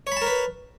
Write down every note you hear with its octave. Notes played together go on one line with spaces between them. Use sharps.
A#4 B4 C#5 A5 B5